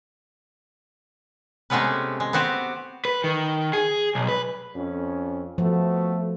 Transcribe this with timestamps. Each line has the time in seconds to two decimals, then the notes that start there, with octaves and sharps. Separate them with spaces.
1.70 C3 G#3 A3 B3 C#4 B4
2.20 G#3
2.33 B3 C4 F#4 G4
3.05 B4
3.24 D#3
3.73 G#4
4.15 B1
4.29 B4
4.74 F2 C#4
5.58 F3 A3 B3 F#4